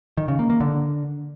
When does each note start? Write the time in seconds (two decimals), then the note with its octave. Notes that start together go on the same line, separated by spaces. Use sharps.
0.17 D#3
0.28 C#3
0.39 A#3
0.50 A#3
0.60 D3